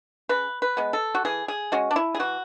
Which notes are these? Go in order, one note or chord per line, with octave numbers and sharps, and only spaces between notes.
C#3 B4
B4
G#3 B3
A4
F#4
E3 G#4
G#4
G#3 C#4 F#4
D4
E4
G#4
E3 F#4